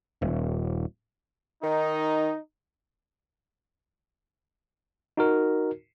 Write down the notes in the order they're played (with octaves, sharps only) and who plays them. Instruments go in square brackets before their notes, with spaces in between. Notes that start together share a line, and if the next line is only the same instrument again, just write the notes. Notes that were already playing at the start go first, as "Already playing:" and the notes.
[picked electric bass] D#1
[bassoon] D#3 [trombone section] D#4
[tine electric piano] D#4 F#4 A#4